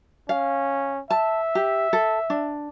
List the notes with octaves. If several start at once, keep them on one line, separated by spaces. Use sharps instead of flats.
C#4 F5
E5 A5
G4
A4
D4